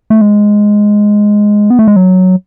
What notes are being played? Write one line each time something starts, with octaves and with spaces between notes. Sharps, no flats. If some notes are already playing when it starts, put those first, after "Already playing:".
A3
G#3
B3
A3
G#3
F#3